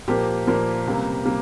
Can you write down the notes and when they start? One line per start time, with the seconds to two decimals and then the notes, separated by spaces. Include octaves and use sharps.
0.08 A#2 F3 A#3 G4
0.47 A#2 F3 A#3
0.86 C#2 C3 G3 A#3
1.25 C3 G3 A#3